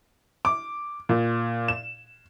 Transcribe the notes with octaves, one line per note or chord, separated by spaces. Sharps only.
D6
A#2
E7